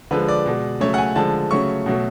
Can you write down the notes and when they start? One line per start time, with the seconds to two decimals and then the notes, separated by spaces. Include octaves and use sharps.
0.11 D3 F3 G#3 B4
0.29 D5
0.46 B2 G#3
0.80 C#3 F#3 A3 C#5
0.94 F#5
0.98 G#5
1.15 D3 F3 G#3 A5
1.51 C#3 F#3 A3 C#6
1.86 B2 F#3 A3